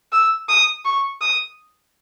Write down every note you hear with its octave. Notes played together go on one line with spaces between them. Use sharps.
E6
D#6
C#6
D#6